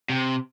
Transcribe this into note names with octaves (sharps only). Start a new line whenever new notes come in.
C3